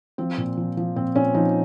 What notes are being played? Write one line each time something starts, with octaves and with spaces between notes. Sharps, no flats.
F3 C4
A#2
F3
F3
A#2 C4
A#2 C#4
F3 D#4